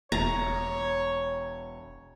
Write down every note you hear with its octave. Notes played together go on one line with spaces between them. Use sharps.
E1 C#5 A#5